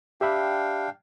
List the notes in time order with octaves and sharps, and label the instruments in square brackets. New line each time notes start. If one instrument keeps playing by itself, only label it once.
[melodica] D4 F5 G5 [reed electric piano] G4 E5 B5